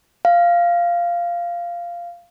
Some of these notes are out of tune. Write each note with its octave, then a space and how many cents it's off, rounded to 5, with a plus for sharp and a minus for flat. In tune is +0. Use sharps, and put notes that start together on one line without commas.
F5 -10